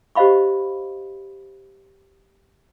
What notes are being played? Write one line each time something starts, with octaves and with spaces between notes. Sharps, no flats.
G4 C5 D#5 F5 B5 C#6